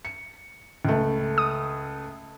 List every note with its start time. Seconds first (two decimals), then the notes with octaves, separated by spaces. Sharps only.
0.05 C#7
0.85 C#2 A3
1.38 D#6